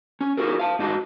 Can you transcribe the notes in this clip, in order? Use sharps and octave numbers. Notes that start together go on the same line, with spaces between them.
C#4
D#4 F4 F#4 G#4 A#4
F5 A5
G#2 D#4 F#4 A5